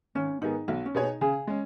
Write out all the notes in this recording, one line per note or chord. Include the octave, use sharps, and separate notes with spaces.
G#1 C#4
G#2 D#3 B3 D#4 G#4
B1 F#4
C#4
B2 B3 G#4 C#5
D#4
C#3 G#4
G#3 C#4